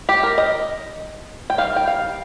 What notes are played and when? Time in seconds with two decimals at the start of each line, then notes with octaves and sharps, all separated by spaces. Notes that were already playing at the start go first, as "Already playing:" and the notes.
0.09 G4
0.23 A#4
0.38 D#5
1.50 G5
1.58 D#3 G3 F5
1.76 G5
1.87 F5